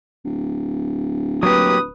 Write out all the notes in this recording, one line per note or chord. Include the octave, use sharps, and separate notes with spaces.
D1
F#3 A#3 G4 B4 D#6